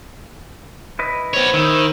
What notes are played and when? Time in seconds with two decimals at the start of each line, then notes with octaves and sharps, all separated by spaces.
0.99 E4 B4 D#5
1.34 B3 C5 C#5
1.54 D#3 E4 E6